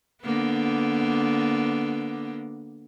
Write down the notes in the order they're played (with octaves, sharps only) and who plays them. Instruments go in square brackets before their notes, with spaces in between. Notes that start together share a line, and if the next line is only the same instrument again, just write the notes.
[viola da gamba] D3 A#3 B3